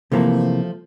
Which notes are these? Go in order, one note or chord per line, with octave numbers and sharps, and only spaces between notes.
C3 E3 F3 A3 A#3